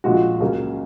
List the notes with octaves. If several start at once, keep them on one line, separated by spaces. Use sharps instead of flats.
A#1 A#2 G#3 F#4
C#2 C#3 F#3 A#3